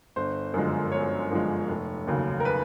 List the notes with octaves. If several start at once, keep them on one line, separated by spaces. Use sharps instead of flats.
G1 C5
F#2 D3 F3 G#3
G1 C#5
F#2 D3 F3 G#3
F1
D#2 C#3 F#3
A#4
B4